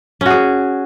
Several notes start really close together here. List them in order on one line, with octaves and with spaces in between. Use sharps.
C#4 F#4 G#4